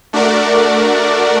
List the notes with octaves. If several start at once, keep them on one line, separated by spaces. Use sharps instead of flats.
A3 D4 F#4 A#4 D5